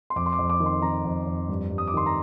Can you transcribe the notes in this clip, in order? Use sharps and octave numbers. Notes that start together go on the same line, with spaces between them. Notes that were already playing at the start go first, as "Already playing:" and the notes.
C6
F2 D6
C6
D6
F2
D6
D#3
C6
D#3 A#5
F2
F2
G2
G2
D#6
D6
D#3 C6
A#5